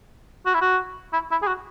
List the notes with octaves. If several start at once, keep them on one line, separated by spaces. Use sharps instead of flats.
F#4
E4
F#4
E4
E4
G#4
F#4